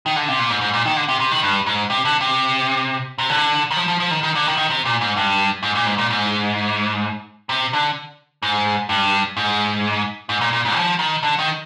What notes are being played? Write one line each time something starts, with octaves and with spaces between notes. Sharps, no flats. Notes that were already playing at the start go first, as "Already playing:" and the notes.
D#3
D3
C3
A#2
G#2
G#2
A#2
D#3
D3
C3
C3
D#3
G2
G#2
C3
D3
C3
C3
D3
D#3
F3
F3
F3
D#3
D#3
D3
D#3
D#3
C3
A#2
G#2
G2
G#2
A#2
G#2
A#2
G#2
C3
D3
G#2
G2
G#2
G#2
A#2
A#2
G#2
F3
D#3
D3
D#3